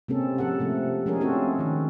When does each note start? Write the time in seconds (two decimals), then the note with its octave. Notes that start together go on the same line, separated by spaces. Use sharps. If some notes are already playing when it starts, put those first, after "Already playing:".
0.08 C3 G#3 A#3 C4 C#4 A4
0.38 F3 A4 F#5
0.59 C3 F3 A3
1.06 F3 G#3 C#4 D4 G#4 A#4
1.21 A3 C4 C#4 F4 F#4 A4
1.59 D#3 F#4